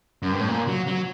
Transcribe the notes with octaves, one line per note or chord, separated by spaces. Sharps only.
F#2
G2
A2
A#2
F#3
F#3